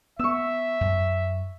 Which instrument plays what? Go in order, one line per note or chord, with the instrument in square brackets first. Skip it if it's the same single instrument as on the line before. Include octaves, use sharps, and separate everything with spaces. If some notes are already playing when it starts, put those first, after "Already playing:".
[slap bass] B3 [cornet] E5 [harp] C#6 E6
[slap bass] F#2